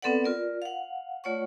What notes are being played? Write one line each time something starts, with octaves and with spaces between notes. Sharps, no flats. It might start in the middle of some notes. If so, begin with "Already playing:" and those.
B3 C4 A4 B4 D5 F#5
F4 A#4 D5
F5 F#5
A3 F4 C#5 D5 F#5 C#6